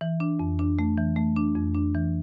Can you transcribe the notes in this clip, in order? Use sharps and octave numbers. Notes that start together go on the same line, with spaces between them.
E3
D4
F2
D4
A3
E3
A3
D4
F2
D4
E3